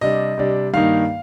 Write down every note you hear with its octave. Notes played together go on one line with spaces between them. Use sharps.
C3 G3 D4 D#5
C3 G3 D4
G2 D#3 A#3 D#4 F5